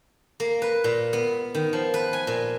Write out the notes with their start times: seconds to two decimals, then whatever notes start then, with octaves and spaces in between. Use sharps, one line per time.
0.40 A#3
0.62 B4
0.84 A#2
1.13 B3
1.55 D#3
1.73 F3
1.94 B4
2.13 G#5
2.27 A#2